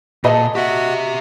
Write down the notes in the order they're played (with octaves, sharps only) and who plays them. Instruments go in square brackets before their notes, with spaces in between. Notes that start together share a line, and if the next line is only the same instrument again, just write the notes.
[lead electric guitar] A#2 [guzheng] D4 A4 [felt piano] G#4 D#5
[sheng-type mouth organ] F#4 [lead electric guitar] G4 E5